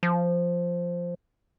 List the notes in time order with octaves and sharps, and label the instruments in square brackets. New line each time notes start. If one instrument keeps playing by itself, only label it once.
[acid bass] F3